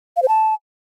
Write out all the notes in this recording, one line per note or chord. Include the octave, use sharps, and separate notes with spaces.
F5
C5
A5